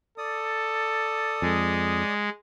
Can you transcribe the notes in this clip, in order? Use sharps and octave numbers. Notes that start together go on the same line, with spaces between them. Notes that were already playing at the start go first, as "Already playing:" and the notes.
A4 D5 D#6
F2 G#3